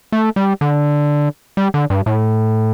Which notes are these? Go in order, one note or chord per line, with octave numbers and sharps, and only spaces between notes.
A3
G3
D3
G3
D3
G2
A2